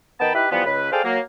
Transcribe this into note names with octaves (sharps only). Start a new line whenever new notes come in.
D#3 B3 D#4 G5 A5 B5
D#4 E4 G4 B4
E3 F3 G3 B3
C#2 B4
G#4 A4 C5 D5 F5 G5
F#3 A#3